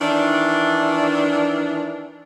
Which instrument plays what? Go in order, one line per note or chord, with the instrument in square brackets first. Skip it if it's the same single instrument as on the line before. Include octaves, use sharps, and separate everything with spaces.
[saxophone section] D#3 E3 D4